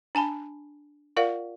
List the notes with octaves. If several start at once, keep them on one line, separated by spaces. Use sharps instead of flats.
D4 G#5 A5 B5
F4 A#4 D5 F5 F#5